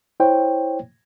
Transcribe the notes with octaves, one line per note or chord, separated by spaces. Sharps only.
E4 C5 C#5 G5